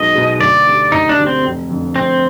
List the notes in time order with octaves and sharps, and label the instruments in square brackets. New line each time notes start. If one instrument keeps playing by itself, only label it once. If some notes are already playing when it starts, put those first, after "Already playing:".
Already playing: [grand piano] B1 B2 G#3 B3 D#4 [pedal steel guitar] D#5
[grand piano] B2 G#3 B3 D#4
[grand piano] D2 [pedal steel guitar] D5
[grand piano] D3 G3
[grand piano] D2 [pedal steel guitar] D#4
[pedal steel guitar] D4
[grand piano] D3 G3
[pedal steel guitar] C4
[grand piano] F1
F2 D3
[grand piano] F1 [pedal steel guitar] C4